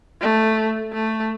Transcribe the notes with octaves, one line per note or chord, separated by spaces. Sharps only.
A3
A3